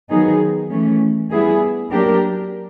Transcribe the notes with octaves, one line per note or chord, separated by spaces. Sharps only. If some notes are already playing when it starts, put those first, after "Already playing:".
D#3 F#3 B3 D#4 G#4
E3 A3 C#4
G3 B3 E4 G#4
F#3 A#3 D4 G4 A#4